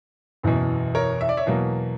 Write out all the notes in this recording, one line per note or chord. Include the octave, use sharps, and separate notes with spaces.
F#1 E2 B2
A#4 C#5
E5
D5
C#5 E5
E2 B2 F#3 A#3